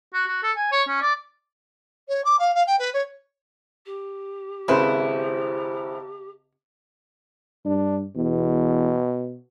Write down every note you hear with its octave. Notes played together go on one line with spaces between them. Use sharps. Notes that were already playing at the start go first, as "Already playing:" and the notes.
F#4
F#4
A4
G#5
C#5
C#4
D5
C#5
D6
F5
F5
G5
B4
C#5
G4
G#1 C#3 E4 B4 C5
G2 D4
E2 B2